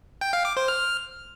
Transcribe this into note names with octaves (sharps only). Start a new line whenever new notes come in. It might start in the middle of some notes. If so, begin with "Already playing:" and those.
G5
F5
D6
C5
F6